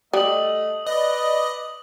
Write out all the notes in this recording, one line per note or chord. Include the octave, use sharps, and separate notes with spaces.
G3 A3 D#5 D#6 F#7
B4 D5 D#5